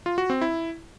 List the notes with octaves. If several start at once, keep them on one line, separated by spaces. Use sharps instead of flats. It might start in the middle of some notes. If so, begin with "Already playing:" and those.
F4
F#4
C4
E4